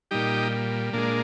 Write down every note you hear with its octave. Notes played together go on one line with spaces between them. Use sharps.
A#2 G3 D#4 G4
A#2 G#3 A#3 D4